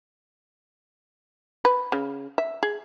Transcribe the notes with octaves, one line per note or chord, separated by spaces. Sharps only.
B4
C#3
E5
G#4